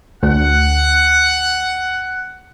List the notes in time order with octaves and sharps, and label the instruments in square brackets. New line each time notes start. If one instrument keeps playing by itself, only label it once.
[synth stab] D2 [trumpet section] F#5